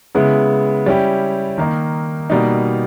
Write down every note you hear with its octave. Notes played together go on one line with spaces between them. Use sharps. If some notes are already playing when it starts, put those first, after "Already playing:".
C#3 G#3 B3 E4
G3 C#4 E4 G4
D#3 A#3 D#4
B2 G3 A#3 D#4